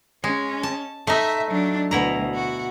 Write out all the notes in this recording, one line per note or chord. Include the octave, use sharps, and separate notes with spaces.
G#3 C#4
A5
A3 D#4 E5
F#3 D4
D2 B2 E4 A#5
F#4